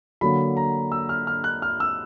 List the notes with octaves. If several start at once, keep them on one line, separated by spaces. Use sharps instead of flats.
D3 F#3 A#3 B5
A#5
E6
F6
F6
F#6
F6
E6